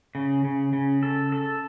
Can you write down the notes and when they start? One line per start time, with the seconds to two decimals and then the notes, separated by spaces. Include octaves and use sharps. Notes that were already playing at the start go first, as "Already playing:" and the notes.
0.15 C#3
0.45 C#3
0.73 C#3
1.03 A4
1.32 A4